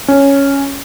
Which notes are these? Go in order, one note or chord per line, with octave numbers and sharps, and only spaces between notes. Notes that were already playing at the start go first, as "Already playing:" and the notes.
C#4